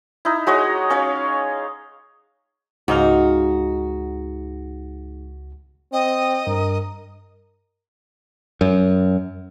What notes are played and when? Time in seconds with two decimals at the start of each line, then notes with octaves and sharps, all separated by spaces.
0.25 D#4 E4
0.47 G#3 F#4 C#5 D#5
0.90 C#4 C#5 F5
2.88 C#2 G#2 D#4 F#4 F5
5.93 C4 D#5
6.47 G2 A#4
8.61 F#2